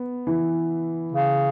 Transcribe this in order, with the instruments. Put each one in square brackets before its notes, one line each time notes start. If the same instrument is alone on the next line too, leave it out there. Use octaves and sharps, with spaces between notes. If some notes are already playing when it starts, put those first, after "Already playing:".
Already playing: [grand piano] B3
E3
[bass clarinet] C#3